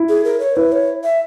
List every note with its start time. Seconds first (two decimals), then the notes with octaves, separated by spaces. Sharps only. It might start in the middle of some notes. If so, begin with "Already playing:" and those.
Already playing: E4
0.09 G#4
0.25 A#4
0.40 C#5
0.56 E4 B4
0.72 C#5
1.04 E5